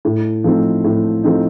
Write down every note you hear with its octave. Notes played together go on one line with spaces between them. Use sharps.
A2
F3 A3 C4 D#4
A2
F3 A3 C4 D#4